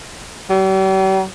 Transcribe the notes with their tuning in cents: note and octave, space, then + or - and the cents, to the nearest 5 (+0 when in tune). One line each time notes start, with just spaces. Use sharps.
G3 -45